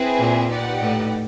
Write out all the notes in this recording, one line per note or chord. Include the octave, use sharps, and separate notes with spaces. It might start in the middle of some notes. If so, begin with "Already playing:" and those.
Already playing: C4 E4 G#4 B4
A#2
D#4 G4 B4 D5 F#5
A2